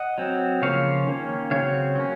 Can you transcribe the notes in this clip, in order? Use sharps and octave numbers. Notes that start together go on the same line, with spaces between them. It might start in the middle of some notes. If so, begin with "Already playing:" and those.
Already playing: D#5 F#5
F#3 C4
C#3 F3 A#3 C#5 F5
D#3 A#3 C#4
C#3 F#3 C4 C#5 F5
F#3 A#3 C#4